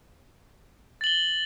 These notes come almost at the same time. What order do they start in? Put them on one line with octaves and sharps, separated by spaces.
A6 F#7 G7